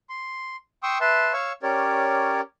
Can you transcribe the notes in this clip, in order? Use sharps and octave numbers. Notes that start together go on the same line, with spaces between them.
C6
G5 C6 C#6 D#6 E6
B4 E5 A5 C6
C#5 F5 C#6 E6
C#4 G4 A#4 C#5 D5